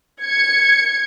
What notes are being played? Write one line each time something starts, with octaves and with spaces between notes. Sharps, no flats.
G#6 C#7